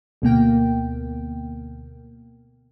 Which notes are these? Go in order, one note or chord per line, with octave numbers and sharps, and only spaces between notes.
D2 B2 A#3 G5